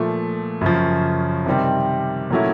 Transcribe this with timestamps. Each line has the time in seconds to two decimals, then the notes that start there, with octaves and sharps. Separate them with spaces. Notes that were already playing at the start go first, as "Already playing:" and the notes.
Already playing: A#2 F3 A3
0.61 F#2 C#3 F3
1.46 C3 D#3 G3 C4
2.31 A#2 F#3 A3 C#4 E4